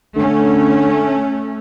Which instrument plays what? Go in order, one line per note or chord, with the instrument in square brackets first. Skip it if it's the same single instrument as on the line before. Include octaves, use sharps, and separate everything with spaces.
[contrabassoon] D3 [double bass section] A3 C#4